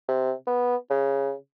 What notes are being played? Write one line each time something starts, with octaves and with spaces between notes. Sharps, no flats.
C3
B3
C#3